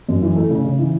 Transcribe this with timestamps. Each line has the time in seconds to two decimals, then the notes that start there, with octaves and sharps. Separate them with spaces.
0.09 F#2
0.22 E3
0.36 A3
0.50 C#3
0.64 C#3
0.79 E3